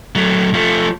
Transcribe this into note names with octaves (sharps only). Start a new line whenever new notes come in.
F#3 A3
F3 A3